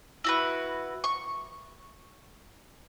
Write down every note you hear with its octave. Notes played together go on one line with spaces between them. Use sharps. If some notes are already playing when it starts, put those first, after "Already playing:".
E4 F#4 B4
C#6